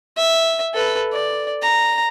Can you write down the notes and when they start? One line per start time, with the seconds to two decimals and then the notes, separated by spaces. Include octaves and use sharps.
0.17 E5
0.74 A4 B4
1.13 D5
1.62 A#5